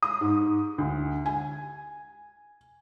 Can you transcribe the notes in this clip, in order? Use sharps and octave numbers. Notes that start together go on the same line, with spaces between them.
D#6
G#2
D2
G#5